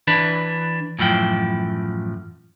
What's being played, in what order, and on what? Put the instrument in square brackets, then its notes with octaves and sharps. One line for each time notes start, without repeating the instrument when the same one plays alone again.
[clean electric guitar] E3 D4 B4
F#2 A2 E3 F3 G5